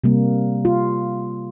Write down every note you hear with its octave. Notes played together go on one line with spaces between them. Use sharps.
C3 G3 A#3
F4